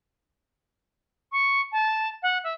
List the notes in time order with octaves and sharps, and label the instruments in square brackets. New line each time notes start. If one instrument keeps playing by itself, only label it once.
[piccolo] C#6
A5
F#5
E5